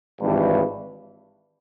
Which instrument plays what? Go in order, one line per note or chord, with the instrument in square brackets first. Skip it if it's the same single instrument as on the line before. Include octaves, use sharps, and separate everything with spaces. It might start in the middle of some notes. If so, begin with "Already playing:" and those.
[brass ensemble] G#1 G2 E3